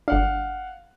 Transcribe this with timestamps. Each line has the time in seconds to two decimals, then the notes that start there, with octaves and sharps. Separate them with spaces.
0.08 G1 D4 F5 F#5